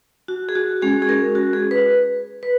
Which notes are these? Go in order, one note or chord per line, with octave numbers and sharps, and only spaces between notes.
F#4
G#4
F#4
G#3 C#4 F#4 G#4
G#4
A#4
F#4
G#4
B4
B4